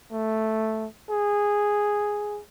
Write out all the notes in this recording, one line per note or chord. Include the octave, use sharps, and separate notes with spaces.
A3
G#4